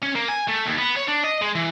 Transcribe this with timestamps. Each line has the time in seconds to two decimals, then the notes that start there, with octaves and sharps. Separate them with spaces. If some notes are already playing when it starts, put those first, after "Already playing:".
0.02 C#4
0.15 A#3
0.28 G#5
0.48 A3
0.65 D#2
0.78 B3
0.96 C#5
1.08 D4
1.24 D#5
1.42 G#3
1.55 E3